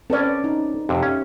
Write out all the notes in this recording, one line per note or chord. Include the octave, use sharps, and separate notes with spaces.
C4 C#4 A4 B4 D5
D#4
F2 C3 G4
C#4 E5